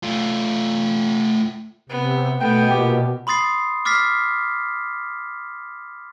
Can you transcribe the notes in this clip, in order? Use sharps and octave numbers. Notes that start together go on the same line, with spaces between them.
A3 F4
C3 B3
B2 A3 B3 G5
A#2 G4
B5 C6 D#6 A6 C7
D6 F6 A6 B6 C7